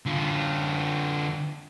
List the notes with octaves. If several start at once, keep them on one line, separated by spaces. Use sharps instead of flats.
D3 F4